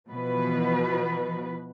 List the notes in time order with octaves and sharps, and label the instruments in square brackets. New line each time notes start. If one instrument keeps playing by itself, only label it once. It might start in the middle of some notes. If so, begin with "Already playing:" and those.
[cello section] B2 E3 F3 B4